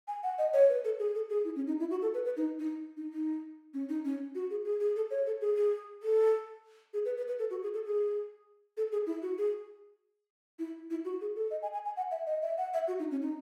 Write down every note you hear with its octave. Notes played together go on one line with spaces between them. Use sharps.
G#5
F#5
D#5
C#5
B4
A4
G#4
A4
G#4
E4
C#4
D#4
E4
F#4
A4
B4
B4
D#4
D#4
D#4
D#4
C#4
D#4
C#4
F#4
G#4
G#4
G#4
A4
C#5
A4
G#4
G#4
A4
G#4
B4
B4
B4
A4
F#4
G#4
A4
G#4
A4
G#4
E4
F#4
G#4
E4
E4
F#4
G#4
A4
D#5
G#5
G#5
G#5
F#5
E5
D#5
E5
F#5
E5
F#4
D#4
C#4
D#4